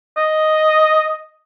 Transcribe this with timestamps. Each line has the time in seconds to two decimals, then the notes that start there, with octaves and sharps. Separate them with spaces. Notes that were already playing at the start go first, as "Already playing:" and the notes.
0.17 D#5